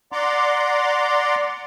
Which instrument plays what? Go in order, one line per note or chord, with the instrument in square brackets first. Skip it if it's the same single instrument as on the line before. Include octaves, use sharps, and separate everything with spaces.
[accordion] D5 F#5 A#5 C6 D6